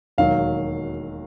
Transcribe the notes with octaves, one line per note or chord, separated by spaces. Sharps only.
E1 D#2 D#3 F#3 F5